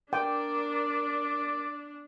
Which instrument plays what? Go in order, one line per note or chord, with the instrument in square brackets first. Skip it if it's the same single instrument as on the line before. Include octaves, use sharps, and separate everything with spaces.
[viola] D4 [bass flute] A#4 [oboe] D5 [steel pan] G5